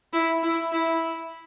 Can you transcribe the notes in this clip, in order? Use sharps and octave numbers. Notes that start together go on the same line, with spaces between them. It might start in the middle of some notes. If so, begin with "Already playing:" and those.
E4
E4
E4